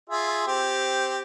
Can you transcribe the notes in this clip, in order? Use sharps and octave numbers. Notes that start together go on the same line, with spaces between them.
F4 G#4 E5
C4 G4